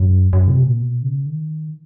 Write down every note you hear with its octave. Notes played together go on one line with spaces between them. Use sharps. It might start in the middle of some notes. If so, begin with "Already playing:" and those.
Already playing: F#2
F#2
C3
A#2
B2
C#3
D#3